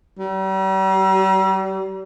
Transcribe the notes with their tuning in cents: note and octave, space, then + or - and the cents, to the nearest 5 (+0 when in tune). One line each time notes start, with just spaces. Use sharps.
G3 -40